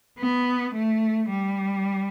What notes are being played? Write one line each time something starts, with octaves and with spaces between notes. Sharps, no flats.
B3
A3
G3